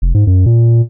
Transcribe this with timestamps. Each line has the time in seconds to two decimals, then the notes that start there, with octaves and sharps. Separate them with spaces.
0.02 F1
0.14 G#2
0.27 F#2
0.46 A#2